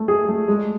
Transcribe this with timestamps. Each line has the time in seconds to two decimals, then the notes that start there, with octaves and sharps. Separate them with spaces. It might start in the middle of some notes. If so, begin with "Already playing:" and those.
Already playing: A3
0.08 G#4
0.28 A3
0.48 G#3